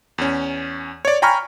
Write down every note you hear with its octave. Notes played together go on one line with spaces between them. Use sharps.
E2 C#4
C#5 D5
G5 G#5 A#5 B5 C#6 F6